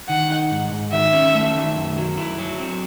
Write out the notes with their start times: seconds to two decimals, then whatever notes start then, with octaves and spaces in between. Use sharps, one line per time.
0.09 D#3 F#5
0.30 D#4
0.51 G#2
0.72 G#2
0.93 D#3 E5
1.13 C#4
1.35 A3
1.56 D#3
1.76 F#2
1.97 F#3
2.18 E4
2.39 F#3
2.60 C4